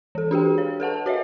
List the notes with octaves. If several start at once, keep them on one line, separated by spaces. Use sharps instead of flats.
E3 A4
D4 G4 G#4 G5
C#5
A4 B4 F#5 A5
F#4 C#5 D#5 E5